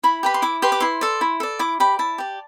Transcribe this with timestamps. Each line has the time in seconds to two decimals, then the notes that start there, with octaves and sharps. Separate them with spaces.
0.03 E4 B5
0.23 G4 B4 B5
0.34 C6
0.42 E4 D6
0.62 G4 B4 C6
0.72 D6
0.80 E4 C6
1.01 A4 D5
1.21 E4
1.40 A4 D5
1.59 E4 D6
1.80 G4 D5 B5
1.99 E4 A5
2.18 G4 D5